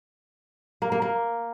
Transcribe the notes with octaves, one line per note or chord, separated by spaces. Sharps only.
A#3
A#3
A#3